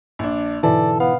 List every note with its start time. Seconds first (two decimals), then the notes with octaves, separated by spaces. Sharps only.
0.19 A#1 D4
0.63 G#2 B2 D3 E3 A4 D5
1.00 B3 F5